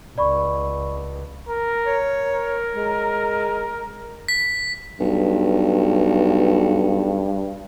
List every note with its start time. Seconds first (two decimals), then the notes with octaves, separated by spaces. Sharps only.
0.18 C#2 D5 B5 C#6
1.49 A#4
1.85 C#5
2.22 A#4
2.74 G#3
4.28 B6
5.00 B1 G2